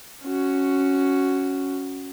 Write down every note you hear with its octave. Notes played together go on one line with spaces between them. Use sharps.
C#4 F#4